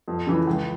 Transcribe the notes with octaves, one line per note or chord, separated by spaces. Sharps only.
F2
C#3 E3
C#2